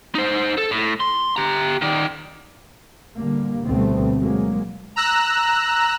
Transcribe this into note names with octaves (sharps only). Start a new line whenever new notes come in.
D#4 C5
A4
A2
C6
G4 A#5
D#3 D5
A#2 D3 G3 A#3
D2 B2 G3 A3 B3 C4
F#3 G#3 A#3
A#5 E6 F#6